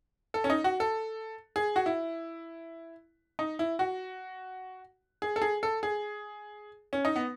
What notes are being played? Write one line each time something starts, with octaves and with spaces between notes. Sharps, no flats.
A4
C#4
D#4
F#4
A4
G#4
F#4
E4
D#4
E4
F#4
G#4
A4
G#4
A4
G#4
C#4
D#4
B3